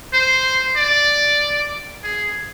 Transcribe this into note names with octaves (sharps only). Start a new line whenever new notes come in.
C5
D5
G#4